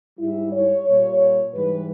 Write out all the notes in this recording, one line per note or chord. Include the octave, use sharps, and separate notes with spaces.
G#2 G3 E4
C#5
A#2 G3
G#2 E3 G3 B4